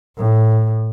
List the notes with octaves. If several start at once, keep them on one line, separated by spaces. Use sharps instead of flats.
A2